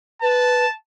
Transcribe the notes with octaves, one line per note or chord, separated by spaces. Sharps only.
B4 A5